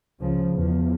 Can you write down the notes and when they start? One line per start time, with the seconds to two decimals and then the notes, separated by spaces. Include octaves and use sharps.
0.20 C#2 C#3 F3
0.53 E2 F3